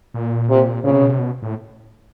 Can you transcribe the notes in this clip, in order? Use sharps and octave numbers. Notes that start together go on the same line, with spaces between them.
A#2
C3
A#2 C#3
C3
B2
C3
B2
A2